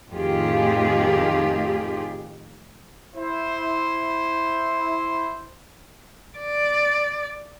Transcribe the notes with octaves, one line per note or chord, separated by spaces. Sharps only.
F2 A2 D#3 F4 G4 G#4
E4 C5
D5